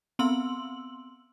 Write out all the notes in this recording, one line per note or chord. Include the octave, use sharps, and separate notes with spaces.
B3 C4 C6 E6 F#7